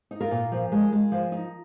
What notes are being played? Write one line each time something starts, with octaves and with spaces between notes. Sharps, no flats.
D#4
F4 A#4
A#2
F3
G#3
G#3
F3
D#4